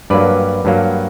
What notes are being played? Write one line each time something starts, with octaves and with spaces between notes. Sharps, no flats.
G2 F#3 A#3 B4 D5
G2 F#3 A#3